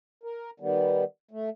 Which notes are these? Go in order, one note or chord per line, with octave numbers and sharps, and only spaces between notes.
A#4
D#3 G3 B3
A3